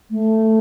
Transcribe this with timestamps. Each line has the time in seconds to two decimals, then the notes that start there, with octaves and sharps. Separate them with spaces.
0.11 A3